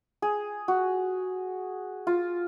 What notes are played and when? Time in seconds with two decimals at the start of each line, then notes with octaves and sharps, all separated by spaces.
0.22 G#4
0.68 F#4
2.07 F4